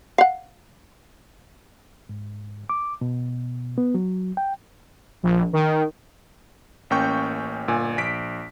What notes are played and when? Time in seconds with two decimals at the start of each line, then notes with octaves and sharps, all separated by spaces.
0.18 F5 F#5
2.09 G#2
2.70 D6
3.01 B2
3.78 B3
3.94 F#3
4.37 G5
5.23 A#1
5.53 D#3
6.90 A1 A#3 C#4 G5 C#6 G6
7.68 G1 A#2 G#5
7.98 A#1 B6 D7